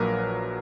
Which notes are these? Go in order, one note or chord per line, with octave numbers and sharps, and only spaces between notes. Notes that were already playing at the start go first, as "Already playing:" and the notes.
Already playing: A#1 A#2 F#3 A#3 A#4 B4